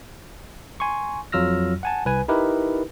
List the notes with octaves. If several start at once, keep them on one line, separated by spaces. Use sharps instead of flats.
G#5 C6 C#6
F2 F#3 F4 E6 F6 A#6
F#5 G#5 A5
C2 B4 G#5
D#4 E4 G4 A#4 B4